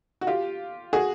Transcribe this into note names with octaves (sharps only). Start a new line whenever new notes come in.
F#4
F4 G4
F#4 G#4